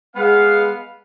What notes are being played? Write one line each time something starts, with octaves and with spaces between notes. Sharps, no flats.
G#3 B3 F5